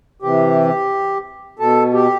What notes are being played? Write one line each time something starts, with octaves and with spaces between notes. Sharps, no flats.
C3 E3 G4
B2 A4
G4